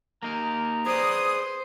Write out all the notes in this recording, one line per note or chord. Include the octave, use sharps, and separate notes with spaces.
A#3 D#4 A#4 A#5
G#4 B4 C5 D5 D#6